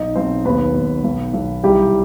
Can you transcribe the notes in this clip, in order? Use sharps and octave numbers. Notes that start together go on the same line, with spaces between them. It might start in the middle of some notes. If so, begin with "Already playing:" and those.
Already playing: B1 D#4 D#5
B1 C4 C5
D#2 B3 B4
D#2
B1
B1
C2 G3 G4